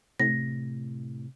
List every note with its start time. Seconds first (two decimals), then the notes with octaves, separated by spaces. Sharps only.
0.20 A2 C3 A#6